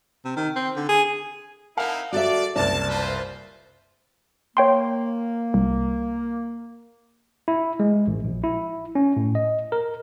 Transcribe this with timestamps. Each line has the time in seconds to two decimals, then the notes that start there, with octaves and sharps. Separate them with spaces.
0.25 C3
0.36 D#3
0.56 C4
0.76 D3
0.89 G#4
1.77 C4 D#4 E4 A#4 F5 F#5
2.13 F#4 A4 D5 E5
2.56 F#1 C2 D5 A5
2.88 F4 B4 C5
4.57 A#3 C#5 G5 C6
5.54 C2
7.48 E4
7.80 G#3
8.07 A1
8.25 A#1
8.44 E4
8.95 C#4
9.16 A2
9.35 D#5
9.72 A#4